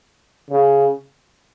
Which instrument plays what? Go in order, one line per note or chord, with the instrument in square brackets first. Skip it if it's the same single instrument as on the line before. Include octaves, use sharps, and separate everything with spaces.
[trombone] C#3